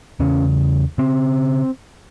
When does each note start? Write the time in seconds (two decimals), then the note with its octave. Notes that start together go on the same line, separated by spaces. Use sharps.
0.20 E2 C#3 C#4
0.98 C#3 C4